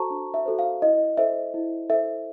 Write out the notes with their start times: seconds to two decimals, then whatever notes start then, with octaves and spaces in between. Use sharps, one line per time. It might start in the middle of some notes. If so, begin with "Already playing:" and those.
Already playing: F#4 A4 C5 A5 A#5 C#6
0.10 D4
0.34 E5
0.46 F#4 A4 C5
0.59 F5
0.82 E4 D#5
1.17 A4 C5 E5
1.54 E4
1.90 A4 C5 E5